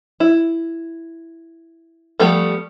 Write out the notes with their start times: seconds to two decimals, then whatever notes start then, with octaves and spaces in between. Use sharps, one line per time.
0.20 E4
2.20 F3 G3 A3 B3 G4